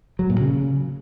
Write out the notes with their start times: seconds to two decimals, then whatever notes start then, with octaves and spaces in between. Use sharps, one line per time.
0.19 F#3
0.30 A#2
0.40 C#3